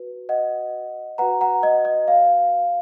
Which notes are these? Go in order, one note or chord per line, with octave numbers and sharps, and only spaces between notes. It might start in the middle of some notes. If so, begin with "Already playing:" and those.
Already playing: F#4 B4
D#5 F#5
F#4 B4 F#5 A#5
F#5 A#5
D#5
D#5
F5